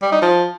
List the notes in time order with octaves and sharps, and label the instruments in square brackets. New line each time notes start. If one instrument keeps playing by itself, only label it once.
[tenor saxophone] G3
D#4
F3